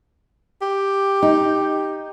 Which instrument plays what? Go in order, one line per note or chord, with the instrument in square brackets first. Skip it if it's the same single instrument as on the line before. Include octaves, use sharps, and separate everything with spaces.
[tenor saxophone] G4
[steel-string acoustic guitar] D#4